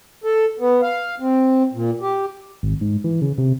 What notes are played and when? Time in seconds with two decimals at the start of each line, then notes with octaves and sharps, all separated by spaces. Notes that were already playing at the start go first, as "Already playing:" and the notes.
0.24 A4
0.59 B3
0.82 F5
1.20 C4
1.73 A#2
2.01 G4
2.63 G#1
2.81 G#2
3.04 E3
3.22 C#3
3.38 C3